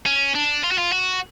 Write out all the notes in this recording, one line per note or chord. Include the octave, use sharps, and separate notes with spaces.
C#4
D4
F4
F#4
F4
F#4